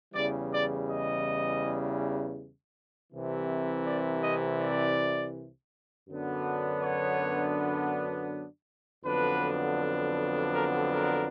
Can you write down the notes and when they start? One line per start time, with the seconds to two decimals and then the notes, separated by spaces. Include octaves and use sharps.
0.14 E2 C#3 E3 G3 D5
0.51 D5
0.88 D#5
3.11 C2 C3 E3
3.85 D5
4.21 D#5
4.59 D5
6.08 F#2 D3 F#3 B3 D4
6.82 C#5
9.04 F2 D3 F#3 B3 D4 B4
10.52 A#4
10.90 A#4